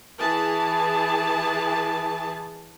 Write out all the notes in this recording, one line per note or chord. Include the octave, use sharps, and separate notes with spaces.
E3 G#4 A5